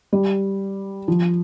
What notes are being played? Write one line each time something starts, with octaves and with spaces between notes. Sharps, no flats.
G3
F3